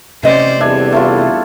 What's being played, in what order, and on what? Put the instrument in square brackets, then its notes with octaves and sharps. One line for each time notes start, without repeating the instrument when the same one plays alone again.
[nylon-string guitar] C3 D#5 [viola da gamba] C#4 C5 D5
[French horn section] E2 G3 A4 [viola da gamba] B3 C4 [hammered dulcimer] D4 E5 G#5
[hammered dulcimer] A3 E4 F4